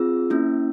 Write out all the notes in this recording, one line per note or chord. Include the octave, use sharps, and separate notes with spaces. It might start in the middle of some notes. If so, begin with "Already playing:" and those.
Already playing: C4 F4 G#4 E6
A#3 C#4 E4